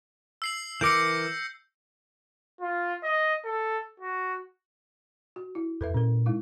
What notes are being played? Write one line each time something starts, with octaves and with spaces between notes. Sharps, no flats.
E6 C7 F#7
E3 A#4 D6 G6 A#6 C#7
F4
D#5
A4
F#4
F#4
E4
F2 A4 B4 E5
A#2 C#4 A#4
G#3 D#4 E4